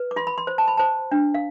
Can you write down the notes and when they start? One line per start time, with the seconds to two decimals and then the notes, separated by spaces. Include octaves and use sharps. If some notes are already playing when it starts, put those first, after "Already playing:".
Already playing: B4
0.11 D6
0.16 F4 C6
0.27 B5
0.38 C6
0.47 C5
0.58 A5
0.68 B5
0.77 C5 A5
1.12 D4
1.34 F5